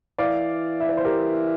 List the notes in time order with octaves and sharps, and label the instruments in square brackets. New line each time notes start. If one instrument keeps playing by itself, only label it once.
[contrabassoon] E3 [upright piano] D5 F5
[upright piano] E5
D5
C5
G4 A#4